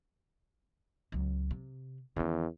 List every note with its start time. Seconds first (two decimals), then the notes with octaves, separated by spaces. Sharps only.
1.12 C#2 F#3
1.51 C3
2.16 E2 D#3 C#4